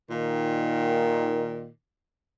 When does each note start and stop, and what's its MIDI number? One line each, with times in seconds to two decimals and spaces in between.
0.11 1.68 46
0.11 1.68 51